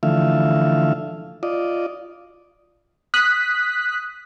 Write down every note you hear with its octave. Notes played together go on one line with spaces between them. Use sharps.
D3 E3 F3 A3 E5 F5
F4 D5 D#5
D#6 F#6 B6